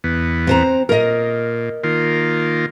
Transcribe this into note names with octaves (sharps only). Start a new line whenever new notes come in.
E2 B3
C4 C5 A#5
A#2 A#4 D#5
D#3 A#3 F4